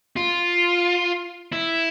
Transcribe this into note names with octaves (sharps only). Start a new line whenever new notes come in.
F4
E4